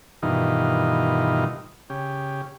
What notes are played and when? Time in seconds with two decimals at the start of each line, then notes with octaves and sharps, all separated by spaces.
0.23 G2 B2 D#3 E3 D#4 F4
1.90 C#3 G4